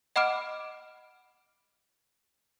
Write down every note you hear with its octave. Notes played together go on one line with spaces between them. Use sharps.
D#5 F#5 B5 D6 F6 D7